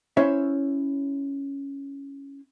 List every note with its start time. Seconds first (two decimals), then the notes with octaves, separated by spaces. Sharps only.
0.17 C#4 E4 C5 C#5 E5